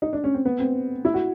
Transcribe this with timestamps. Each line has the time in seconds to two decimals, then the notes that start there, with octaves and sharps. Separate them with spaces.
0.02 D#4
0.13 D4
0.24 C#4
0.34 C4
0.45 B3
0.60 C4
1.05 E4
1.14 F#4